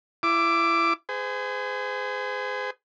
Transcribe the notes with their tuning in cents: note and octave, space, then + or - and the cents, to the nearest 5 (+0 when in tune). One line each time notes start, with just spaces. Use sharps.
E4 +25 D6 +0
G#4 +0 C5 -45